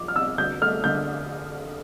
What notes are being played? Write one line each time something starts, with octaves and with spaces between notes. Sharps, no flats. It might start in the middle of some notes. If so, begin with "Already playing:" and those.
Already playing: F3 D6
F6
C3 E6
D2 G6
A3 F6
D3 G6